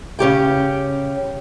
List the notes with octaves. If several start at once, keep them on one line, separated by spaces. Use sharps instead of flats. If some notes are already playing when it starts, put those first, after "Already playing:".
C#3 C#4 G4 G5